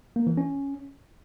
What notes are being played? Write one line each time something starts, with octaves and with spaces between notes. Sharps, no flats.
A#3
E3
C#4